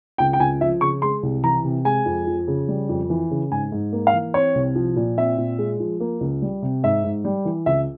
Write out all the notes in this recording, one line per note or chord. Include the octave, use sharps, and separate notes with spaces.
C#2 G5
G5
C#2 G#5
F3 E5
C#3 C#6
G#3 C6
C2
E3 A#5
C3
G#3 G#5
F2
F3
C#3
G3
F2
E3
C#3
G#2 G#5
G#2
A#3
F5
E3
C4 C#5
C2
F3
A#2
C4 E5
A#2
G#3
F3
A#3
C#2
G3
C3
G#2 E5
G#2
G3
E3
C#2 E5